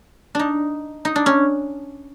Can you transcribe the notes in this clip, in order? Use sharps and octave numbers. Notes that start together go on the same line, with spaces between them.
D4 D#4
D#4
D4
C#4